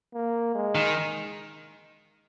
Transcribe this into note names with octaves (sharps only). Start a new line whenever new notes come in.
A#3
G#3
D#3